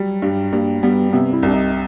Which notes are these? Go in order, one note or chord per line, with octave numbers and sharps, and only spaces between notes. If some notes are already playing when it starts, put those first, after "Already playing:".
Already playing: F#3 G3
G2
G2 A#3
G3 B3
C3 B3
E4
C2
D4
D#4